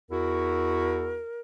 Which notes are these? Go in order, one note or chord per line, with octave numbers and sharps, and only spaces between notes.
E2 E4 F#4 A#4